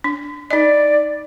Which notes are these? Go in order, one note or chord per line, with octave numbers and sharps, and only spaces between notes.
D4
D#4 D5 D#5